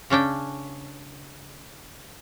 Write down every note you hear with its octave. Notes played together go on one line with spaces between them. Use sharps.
C#3 C#4 D4 G5